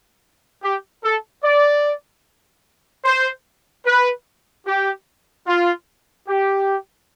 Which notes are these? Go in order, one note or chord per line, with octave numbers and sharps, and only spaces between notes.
G4
A4
D5
C5
B4
G4
F4
G4